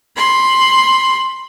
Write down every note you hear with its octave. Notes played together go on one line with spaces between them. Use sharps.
B5 C6